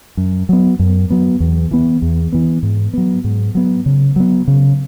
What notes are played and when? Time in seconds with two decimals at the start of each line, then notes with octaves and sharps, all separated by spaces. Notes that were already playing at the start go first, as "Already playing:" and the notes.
0.17 F#2
0.49 F#3 B3
0.79 F#2
1.10 F#3 B3
1.40 E2
1.71 E3 B3
2.02 E2
2.32 E3 B3
2.63 G#2
2.93 F#3 B3
3.24 G#2
3.55 F#3 B3
3.86 C#3
4.16 F#3 B3
4.48 C#3